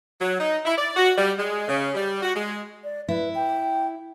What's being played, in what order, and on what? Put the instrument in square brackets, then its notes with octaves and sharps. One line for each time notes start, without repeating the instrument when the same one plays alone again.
[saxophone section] F#3
D#4
E4
D5
F#4
G3
G#3
C#3
G3
F#4
G#3
[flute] D5
[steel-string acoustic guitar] E4 [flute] B4
[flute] G5